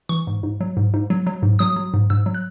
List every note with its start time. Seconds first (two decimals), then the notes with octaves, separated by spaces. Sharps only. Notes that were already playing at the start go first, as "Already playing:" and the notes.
0.09 E3 C#6
0.27 G#2
0.43 G#2
0.60 F#3
0.77 G#2
0.94 G#2
1.10 F#3
1.27 F#3
1.43 G#2
1.59 F#3 D#6
1.76 F#3
1.94 G#2
2.10 G#2 E6
2.26 F#3
2.34 F#6